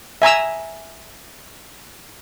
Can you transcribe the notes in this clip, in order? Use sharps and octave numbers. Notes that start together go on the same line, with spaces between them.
E5 G#5 A#5 E6